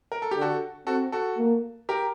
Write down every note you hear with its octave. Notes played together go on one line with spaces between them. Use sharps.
A#4
A4
D3 G4
F#4 A4
C4 F#4 A4
F#4 A4
A#3
G4 A#4